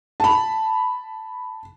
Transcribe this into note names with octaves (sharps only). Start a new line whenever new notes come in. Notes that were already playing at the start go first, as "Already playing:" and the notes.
A5 B5